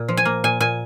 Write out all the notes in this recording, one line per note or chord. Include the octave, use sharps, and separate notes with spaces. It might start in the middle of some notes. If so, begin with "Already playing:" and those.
Already playing: A#2
F3
G#5
A#3
A#2 G#5
A#2 G#5